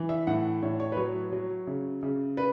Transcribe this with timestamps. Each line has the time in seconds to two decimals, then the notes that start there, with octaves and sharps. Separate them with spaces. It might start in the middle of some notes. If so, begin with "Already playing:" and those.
Already playing: E3
0.09 E5
0.27 A2 F#5
0.62 A2 C#5
0.80 C#5
0.92 B4
0.97 F#3 C#5
1.32 F#3
1.67 C#3
2.03 C#3
2.37 B4